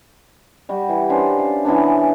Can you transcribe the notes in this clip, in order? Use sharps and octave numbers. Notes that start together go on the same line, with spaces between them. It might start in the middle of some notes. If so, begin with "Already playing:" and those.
G3 F#4 G4
E3
C#4 D4 B4 C5
F5
E3 B3 C#4 D4